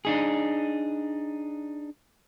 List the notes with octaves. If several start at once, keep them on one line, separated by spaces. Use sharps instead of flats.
D4 D#4 G#4